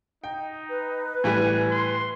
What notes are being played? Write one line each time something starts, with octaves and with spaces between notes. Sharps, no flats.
D#4 G5
B4
A2 E3 G3 G#5
C6